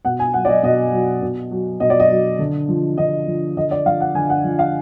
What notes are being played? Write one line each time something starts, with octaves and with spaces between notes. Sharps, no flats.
B2 F#5
G#5
F#3 F#5
D5
D#5
B2 D#5
F#3
B2
F#3
B2 D#5
D5
D#5
F#3
D3
F3
D3 D#5
F3
D3 D#5
D5
F3 F5
F#5
D3 G#5
F#5
F3
F5